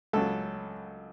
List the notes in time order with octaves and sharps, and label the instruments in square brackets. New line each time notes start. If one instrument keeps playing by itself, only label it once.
[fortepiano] C#2 C#3 F#3 A4